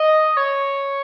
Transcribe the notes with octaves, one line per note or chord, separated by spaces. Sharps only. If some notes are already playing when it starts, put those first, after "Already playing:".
Already playing: D#5
C#5